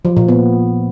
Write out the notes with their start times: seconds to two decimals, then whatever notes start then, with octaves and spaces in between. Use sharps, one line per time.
0.05 F3
0.17 A#2
0.28 B3